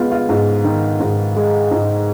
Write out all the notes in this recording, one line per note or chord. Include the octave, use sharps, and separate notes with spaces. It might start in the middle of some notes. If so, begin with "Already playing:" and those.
Already playing: G#3 B3 F4
F4
G#2
D#3
G#2
G#3
G#2